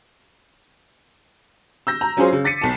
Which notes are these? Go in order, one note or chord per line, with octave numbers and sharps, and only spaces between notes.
E6 G6 A#6
A#5
F#3 C#4 F4 G#4 C5
C#3
D6 A6 B6 C#7 D#7
B1 A5